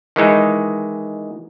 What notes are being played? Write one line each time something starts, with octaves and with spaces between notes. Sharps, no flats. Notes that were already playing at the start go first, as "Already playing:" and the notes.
D#3 E3 G#3 D#4